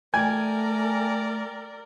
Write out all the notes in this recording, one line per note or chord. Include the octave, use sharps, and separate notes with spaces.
A3 A#4 D5 G5 G#5 G#6